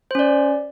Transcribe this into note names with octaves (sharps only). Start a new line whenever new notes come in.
C#4 C5 D5